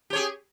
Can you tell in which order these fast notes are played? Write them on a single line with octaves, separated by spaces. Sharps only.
G4 C#5 G#4